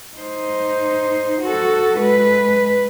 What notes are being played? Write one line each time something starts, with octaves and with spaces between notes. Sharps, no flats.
D#4 C5
F#4 A4
G#3 B4